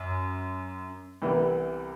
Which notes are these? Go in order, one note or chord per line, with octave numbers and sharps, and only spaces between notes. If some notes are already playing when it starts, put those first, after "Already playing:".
Already playing: F#2
C2 C3 E3 G3 B3